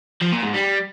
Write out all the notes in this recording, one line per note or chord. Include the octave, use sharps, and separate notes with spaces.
F3
A#2
G#2
G3